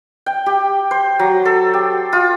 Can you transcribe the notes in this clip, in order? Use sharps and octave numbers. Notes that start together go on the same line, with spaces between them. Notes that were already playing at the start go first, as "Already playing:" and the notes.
G5
G4
C5
F#3
A4
G4
F4